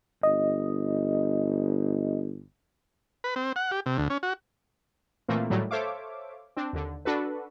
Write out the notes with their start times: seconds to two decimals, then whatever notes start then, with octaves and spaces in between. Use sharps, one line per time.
0.23 G1 D#5
3.24 B4
3.36 C4
3.56 F#5
3.71 G4
3.86 C3
3.98 D2
4.10 C#4
4.23 F#4
5.28 A#2 E3 A3 A#3 C4
5.50 A2 D#3 F#3 G3 A3
5.71 A4 C5 C#5 E5 F5 D6
6.56 C4 D4
6.73 D#2 D3
7.05 D4 F#4 A4 B4